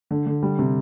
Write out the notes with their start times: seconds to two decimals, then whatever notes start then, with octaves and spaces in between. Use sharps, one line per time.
0.11 D3
0.26 D3
0.43 G3
0.59 C3